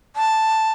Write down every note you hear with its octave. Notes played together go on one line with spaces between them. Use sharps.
A5